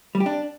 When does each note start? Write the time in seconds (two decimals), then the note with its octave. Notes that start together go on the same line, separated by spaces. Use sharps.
0.15 G3
0.20 G4
0.26 D4